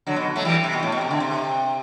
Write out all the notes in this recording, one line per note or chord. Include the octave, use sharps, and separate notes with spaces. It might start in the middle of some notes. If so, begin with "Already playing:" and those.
D3 F#3
B2
F#3 A3
E3 G3
C3
B2
A2
B2
C3
D3
C3